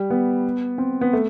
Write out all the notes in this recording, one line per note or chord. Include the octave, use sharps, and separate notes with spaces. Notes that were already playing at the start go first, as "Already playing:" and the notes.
Already playing: G3
B3
C4
B3
A3